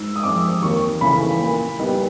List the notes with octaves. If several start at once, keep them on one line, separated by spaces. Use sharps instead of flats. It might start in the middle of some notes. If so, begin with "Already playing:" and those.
Already playing: G#2 E6
D#6
F3 G#3 C4 D6
D#2 C#6
C#3 E3 A3 B5
A#2
G3 B3 D#4